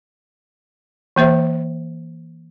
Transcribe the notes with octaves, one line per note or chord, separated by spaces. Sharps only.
E3 A#3 C5 E5